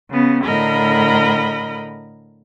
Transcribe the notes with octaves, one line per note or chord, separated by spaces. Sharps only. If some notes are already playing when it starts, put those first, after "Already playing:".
C#3 B3
A2 D3 A#4 D#5 B5